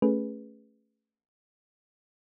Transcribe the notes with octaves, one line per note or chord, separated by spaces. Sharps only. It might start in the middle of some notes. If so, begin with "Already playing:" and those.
A3 C#4 G#4 B4